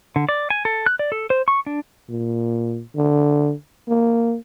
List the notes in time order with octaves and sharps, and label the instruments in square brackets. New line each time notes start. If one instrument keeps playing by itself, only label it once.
[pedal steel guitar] D3
D5
G#5
A4
F#6
D5
A4
C5
C#6
D4
[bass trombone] A#2
D3
A#3